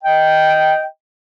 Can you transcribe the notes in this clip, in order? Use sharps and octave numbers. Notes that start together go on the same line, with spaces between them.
D#5 G5